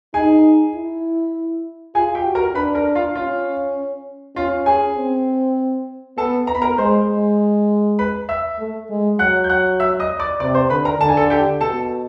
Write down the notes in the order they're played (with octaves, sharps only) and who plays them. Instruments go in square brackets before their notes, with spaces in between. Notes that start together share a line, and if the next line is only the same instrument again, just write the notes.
[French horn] D#4 [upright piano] G#4 G#5
[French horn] E4
[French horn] F4 [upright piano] G#4 G#5
[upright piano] G4 G5
[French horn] F#4
[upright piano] A#4 A#5
[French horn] D4 [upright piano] B4 B5
[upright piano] A#4 A#5
F4 F5
[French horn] C#4 [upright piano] F4 F5
[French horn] C#4 [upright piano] F4 F5
[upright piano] G#4 G#5
[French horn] C4
[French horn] B3 [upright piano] A4 A5
[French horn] B3 [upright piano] A#5
[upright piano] B5
A#4 A#5
[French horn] G#3 [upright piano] C5 C6
[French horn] G#3
[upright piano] B4 B5
E5 E6
[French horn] A3
G#3
[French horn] F#3 [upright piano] F#5 F#6
[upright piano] G6
F#5 F#6
E5 E6
D#5 D#6
D5 D6
[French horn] C3 [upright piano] D5 D6
[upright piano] C5 C6
[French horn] D3 [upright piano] B4 B5
[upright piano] A#4 A#5
[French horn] D3 [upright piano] A5
[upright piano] G#5
A4 A5
G4 G5
[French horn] B2 [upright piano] A4 A5